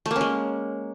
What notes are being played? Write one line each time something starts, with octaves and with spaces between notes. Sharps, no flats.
A3
A#3
C#4
G#3